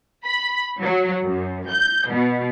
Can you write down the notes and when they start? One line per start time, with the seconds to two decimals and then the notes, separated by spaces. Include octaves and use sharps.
0.25 B5
0.81 F#3
1.23 F#2
1.69 G6
2.09 B2